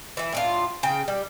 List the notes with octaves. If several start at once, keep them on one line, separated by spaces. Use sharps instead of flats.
E3 E4
A2 D4 F4
C#3 G5
G3